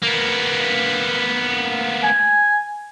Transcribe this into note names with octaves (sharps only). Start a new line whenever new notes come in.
A#3 B3
G#5